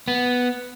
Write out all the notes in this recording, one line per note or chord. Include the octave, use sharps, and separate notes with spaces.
B3